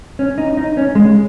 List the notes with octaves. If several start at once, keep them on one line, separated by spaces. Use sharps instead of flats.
C#4
D#4
D#4
C#4
G#3